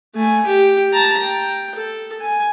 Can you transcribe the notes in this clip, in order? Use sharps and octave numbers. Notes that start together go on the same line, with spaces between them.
A3 G#5
G4 G5
A5 A#5
G5
A4
G#5